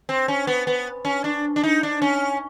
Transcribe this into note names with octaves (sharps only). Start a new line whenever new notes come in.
C4
C#4
B3
B3
C#4
D4
D4
D#4
D4
C#4